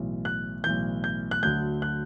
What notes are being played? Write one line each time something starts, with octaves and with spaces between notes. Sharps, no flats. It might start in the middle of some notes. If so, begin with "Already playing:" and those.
Already playing: B1 A2 E3
F#6
B1 A2 E3 G6
G6
F#6
D2 D3 F#3 G6
F#6